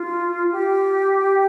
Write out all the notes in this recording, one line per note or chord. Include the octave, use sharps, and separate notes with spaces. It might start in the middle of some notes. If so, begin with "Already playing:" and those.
Already playing: F4
G4